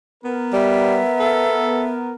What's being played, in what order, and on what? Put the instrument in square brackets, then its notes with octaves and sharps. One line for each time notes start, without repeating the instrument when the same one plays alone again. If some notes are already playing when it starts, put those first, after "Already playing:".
[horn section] B3 A#4
[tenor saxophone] G3 [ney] E5
[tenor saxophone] A4